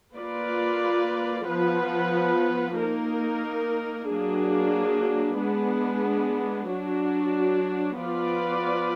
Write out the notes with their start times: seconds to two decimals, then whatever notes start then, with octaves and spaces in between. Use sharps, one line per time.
0.15 A#3 F4 B4 D5
1.46 F3 B3 F4 B4
2.77 A#3 D#4 A#4
4.08 F#3 A#3 D4 G#4
5.38 G#3 B3 D4
6.69 F#3 D4 F#4
8.00 F3 B3 F4 B4 D5